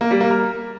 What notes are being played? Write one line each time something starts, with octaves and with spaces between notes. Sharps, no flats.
A#3
G3
A#3
A#4